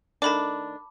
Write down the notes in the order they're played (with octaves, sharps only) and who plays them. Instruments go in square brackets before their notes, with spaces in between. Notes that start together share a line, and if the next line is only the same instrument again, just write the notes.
[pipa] D#3 A3 D4 [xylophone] A5 B5 D6